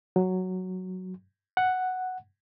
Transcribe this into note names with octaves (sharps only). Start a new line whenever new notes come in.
F#3
F#5